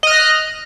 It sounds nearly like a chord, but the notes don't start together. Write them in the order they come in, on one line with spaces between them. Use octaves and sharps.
D#5 F6 F#6